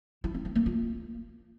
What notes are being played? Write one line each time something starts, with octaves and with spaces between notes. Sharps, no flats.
E4
C4
C4
A#3
F4